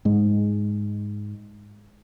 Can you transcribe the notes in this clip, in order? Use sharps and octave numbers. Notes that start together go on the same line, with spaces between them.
G#2 G#3